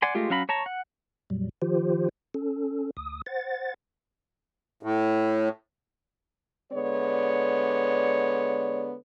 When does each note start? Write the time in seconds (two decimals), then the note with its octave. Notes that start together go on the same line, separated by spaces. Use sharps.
0.02 D5 F#5 G#5 C6
0.15 G#3 A3 F4 G4
0.30 F#3 C#4 F5 A#5 B5
0.49 C#5 A5 A#5 C#6
0.66 F#5
1.30 F2 A#2 F#3 G3
1.62 D#3 F3 F4 G4 C5
2.34 C#4 A4
2.97 D2 D#6
3.26 C5 F#5 A6
4.83 A2
6.72 D3 G#3 B3 C#5 D5